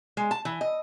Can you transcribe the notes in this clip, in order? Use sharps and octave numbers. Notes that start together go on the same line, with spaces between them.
G#3
A5
E3
D#5